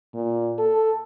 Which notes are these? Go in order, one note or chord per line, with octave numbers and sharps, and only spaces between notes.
A#2
A4